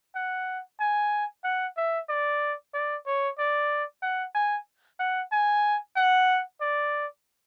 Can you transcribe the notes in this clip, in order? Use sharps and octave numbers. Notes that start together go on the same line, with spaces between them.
F#5
G#5
F#5
E5
D5
D5
C#5
D5
F#5
G#5
F#5
G#5
F#5
D5